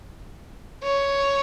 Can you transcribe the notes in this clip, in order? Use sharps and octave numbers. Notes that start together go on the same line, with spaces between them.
C#5